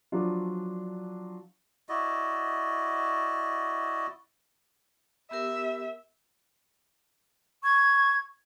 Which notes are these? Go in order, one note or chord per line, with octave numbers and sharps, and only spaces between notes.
F3 F#3 D4 F4
E4 F#4 D5 D#5
B3 G4 A#4 E5
C#6 G#6